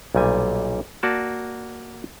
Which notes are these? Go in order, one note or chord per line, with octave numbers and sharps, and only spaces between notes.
B1 A#2 G3 G#5
A#3 F#4 D5 A5